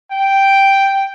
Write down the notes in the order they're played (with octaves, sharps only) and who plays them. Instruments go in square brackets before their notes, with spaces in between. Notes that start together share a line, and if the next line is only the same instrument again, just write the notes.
[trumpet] G5